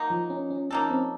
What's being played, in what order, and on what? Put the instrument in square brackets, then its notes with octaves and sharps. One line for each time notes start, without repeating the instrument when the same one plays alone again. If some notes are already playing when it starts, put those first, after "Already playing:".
Already playing: [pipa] F#3 A#3 D#4
[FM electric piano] F3
C#4
C#4
[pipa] A#3 D#4 A4 [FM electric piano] C#4
[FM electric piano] C4